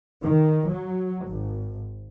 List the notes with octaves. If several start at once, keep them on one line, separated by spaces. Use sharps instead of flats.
D#3
F#3
G#1